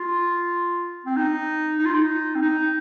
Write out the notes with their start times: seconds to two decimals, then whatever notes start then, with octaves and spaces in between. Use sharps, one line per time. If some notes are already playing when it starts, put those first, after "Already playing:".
Already playing: F4
1.05 C4
1.16 D#4
1.79 D#4
1.86 F4
1.94 D#4
2.35 C4
2.42 D#4